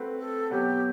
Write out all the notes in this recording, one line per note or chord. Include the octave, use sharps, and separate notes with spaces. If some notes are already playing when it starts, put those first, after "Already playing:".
Already playing: A3 C4 F#4 B4
A4
B2 F#3 B3 G4